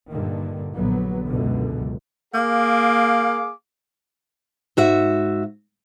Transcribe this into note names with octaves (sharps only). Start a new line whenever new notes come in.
G2 A#2 D3 D#3
A#1 D3 F#3 B3
C#2 F#2 B2 D3
A#3 G#4 F5 D6
G#2 F#4 E5